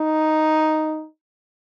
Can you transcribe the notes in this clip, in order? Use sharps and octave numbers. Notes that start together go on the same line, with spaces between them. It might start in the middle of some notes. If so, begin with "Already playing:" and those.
Already playing: D#4